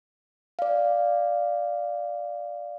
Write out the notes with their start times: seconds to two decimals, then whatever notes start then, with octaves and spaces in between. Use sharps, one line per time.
0.59 D5 F5